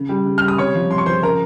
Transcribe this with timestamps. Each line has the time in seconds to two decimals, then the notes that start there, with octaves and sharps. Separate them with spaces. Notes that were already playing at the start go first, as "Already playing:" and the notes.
Already playing: C#3
0.09 G3
0.26 C#3
0.38 G3 F6
0.48 D#6
0.58 C3 C#5 C#6
0.75 F3
0.91 C3 C6
0.98 C#6
1.06 F3 C5 C6
1.23 C#3 A#4 A#5